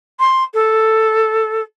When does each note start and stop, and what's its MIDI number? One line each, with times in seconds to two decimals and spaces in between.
0.19 0.44 84
0.54 1.62 69